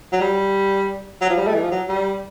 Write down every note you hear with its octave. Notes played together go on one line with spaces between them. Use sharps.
F#3
G3
F#3
F3
G3
A3
E3
F3
F#3
G3